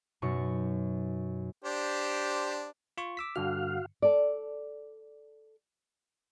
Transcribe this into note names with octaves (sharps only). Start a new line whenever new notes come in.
F#2 B2 D#4 C#6
D4 G4 C5
F4 C#6
D6 E6 B6
G2 D3 F#4 F5 F6
A4 D5